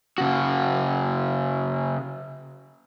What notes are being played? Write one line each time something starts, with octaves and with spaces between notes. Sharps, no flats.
C#3 F#4